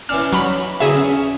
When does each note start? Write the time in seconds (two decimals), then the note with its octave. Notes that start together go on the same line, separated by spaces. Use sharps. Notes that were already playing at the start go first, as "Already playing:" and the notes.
0.09 E3 C#4 D4 F6
0.33 F#3 D#4 B5
0.80 E2 D3 F#3 G#4 E5
0.94 C#4